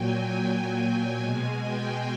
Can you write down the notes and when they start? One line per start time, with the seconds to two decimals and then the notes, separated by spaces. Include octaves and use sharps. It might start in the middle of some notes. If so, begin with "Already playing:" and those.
Already playing: A#2 F#3 G5 G#5
0.28 G#5
1.18 B2 G#3 G#5
1.62 G5